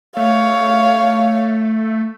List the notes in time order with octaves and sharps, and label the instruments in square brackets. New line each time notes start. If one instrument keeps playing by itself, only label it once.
[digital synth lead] A3 [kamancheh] C#5 F5